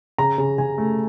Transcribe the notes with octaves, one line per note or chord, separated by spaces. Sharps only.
C#3 A#5
C#3
C#3 G#5
A3